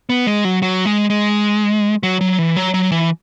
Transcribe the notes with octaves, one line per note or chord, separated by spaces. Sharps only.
B3
G#3
F#3
F#3
G#3
G#3
F#3
F#3
E3
F#3
F#3
E3